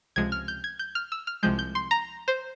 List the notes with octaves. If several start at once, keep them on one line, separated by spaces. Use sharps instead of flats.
C#2 C3 F3 G#3 G#6
F6
G6
G#6
G6
F6
E6
F6
C2 C3 F3 G#3 G6
G6
C6
A#5
C5